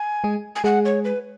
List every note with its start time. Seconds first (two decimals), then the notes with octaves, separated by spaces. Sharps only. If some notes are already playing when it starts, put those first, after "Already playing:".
Already playing: G#5
0.24 G#3 G#4
0.56 G#5
0.64 G#3 G#4 F#5
0.85 C#5
1.05 B4